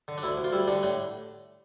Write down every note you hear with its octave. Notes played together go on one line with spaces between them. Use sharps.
D3
D4
D2 E4
D2
F4
G3 E4
D3 D4
A2 D4